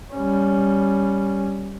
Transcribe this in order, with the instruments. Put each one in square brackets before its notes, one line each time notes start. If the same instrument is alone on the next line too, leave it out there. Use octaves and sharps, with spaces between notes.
[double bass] G3 C#4